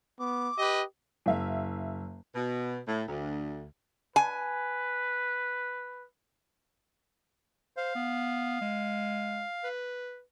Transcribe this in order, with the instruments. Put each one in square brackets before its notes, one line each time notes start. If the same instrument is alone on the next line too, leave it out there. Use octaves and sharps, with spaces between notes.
[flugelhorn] B3 [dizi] D6
[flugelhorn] G4 [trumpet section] B4 D#5
[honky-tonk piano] F#1 E5 F5
[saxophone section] B2
A2
D2
[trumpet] B4 [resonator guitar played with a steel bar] G#5
[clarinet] C5 [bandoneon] F5
[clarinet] B3
G#3
B4